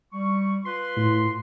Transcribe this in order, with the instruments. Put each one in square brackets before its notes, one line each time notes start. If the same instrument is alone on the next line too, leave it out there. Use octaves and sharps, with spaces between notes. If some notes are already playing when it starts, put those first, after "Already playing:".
[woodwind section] G3 C#6
F4 B4 C6
[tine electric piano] A2